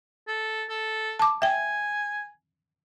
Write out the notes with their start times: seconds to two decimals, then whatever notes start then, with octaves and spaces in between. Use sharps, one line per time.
0.27 A4
0.69 A4
1.19 A5 D6
1.42 E5 G5 G#5